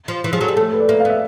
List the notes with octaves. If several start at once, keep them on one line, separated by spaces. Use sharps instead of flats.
F3
E3
F3 G#4
F#3 A4
G3
A3 A4
B4
D5
A#3 E5
F5
B3 E5